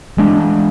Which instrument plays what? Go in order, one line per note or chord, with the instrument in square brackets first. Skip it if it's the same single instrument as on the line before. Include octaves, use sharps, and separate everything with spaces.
[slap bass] E3 G#3 D4